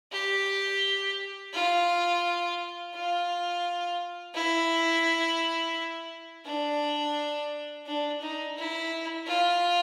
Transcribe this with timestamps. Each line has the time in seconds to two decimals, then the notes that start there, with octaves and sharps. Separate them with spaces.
0.12 G4
1.54 F4
2.94 F4
4.35 E4
6.45 D4
7.86 D4
8.21 D#4
8.57 E4
9.27 F4